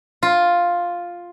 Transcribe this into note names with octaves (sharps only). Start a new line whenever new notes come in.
F4